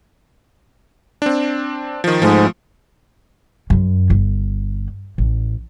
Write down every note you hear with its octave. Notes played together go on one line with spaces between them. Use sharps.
C4 D4
D#3 F3
G#2 F3 A3
F#2
G1
A1